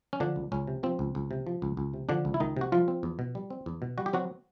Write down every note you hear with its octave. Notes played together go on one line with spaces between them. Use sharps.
C#4
D3 F3 D4
C#2
C#2 C#4
C3
F3 C4
C#2
C#2
C3
F3
C#2
C#2
C3
D3 F3 D4
C#2
E4
C#2 D#3 D#4
C3 F#4
F3 G3 F4
C4
E2
B2
G3
C4
E2
B2
G3 F#4
G4
F#3 C4 F#4